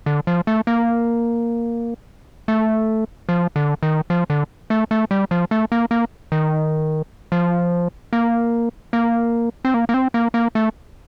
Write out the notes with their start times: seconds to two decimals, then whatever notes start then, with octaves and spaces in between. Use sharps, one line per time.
0.06 D3
0.27 F3
0.47 A3
0.67 A#3
2.48 A3
3.29 F3
3.56 D3
3.83 D#3
4.10 F3
4.30 D3
4.70 A3
4.91 A3
5.11 G3
5.31 F3
5.51 A3
5.72 A#3
5.91 A#3
6.32 D#3
7.32 F3
8.13 A#3
8.93 A#3
9.65 C4
9.74 A#3
9.89 A#3
9.94 C4
10.14 A#3
10.34 A#3
10.55 A3